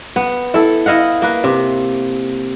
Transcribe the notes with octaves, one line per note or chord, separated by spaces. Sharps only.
B3
E4 A4
E4 D#5 F5 F#5
A#3 B4
C3